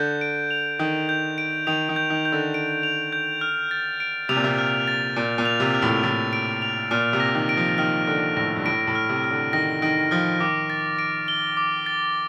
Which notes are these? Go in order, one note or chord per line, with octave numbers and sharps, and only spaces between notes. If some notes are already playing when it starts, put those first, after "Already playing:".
Already playing: D3 G6
D7
F7
D#3 G6
G6
D7
D#3 F7
D#3
G6
D#3
G6
D3
D7
F7
G6
F6
A6
D7
C3 F7
A#2
C3
F6
A6
A#2 D7
A#2
F7
C3
F6
A2
A2 A6
D7
F7
A#2 F6
C3
A#6
D#3
D7
F3
D#3 F6
D3 F6
A2 A#6
G2
A2 D7
A2
F6
C3
F6
D3
D#3 A#6
D#3 D7
F3 F6
D#3 D6
A6
D7
G7
D6
A6